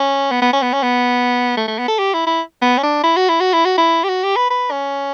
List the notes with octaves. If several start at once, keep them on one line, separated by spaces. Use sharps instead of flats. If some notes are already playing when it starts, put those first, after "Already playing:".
Already playing: C#4
B3
B3
C#4
B3
C#4
B3
A3
A3
B3
A4
G4
E4
E4
B3
C#4
D4
E4
F#4
E4
F#4
E4
F#4
E4
G4
F#4
G4
B4
B4
C#4